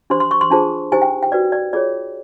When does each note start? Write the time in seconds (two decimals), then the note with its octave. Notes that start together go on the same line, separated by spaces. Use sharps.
0.10 D4 G4 C5 C6
0.20 C6
0.31 C#6
0.41 C6
0.50 D4 F4 G#4 C5 A5
0.92 D#4 G4 C5 G#5
1.02 G5
1.23 G5
1.32 F#4 B4 D5
1.52 D5
1.73 F4 G#4 C#5 D5